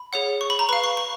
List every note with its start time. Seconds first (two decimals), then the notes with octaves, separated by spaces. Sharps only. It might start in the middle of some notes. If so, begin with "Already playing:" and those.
Already playing: B5
0.13 G#4 C#5 F#5
0.41 C#6
0.50 B5
0.59 A#5
0.69 B4 F5 B5
0.84 C#6
0.97 C#6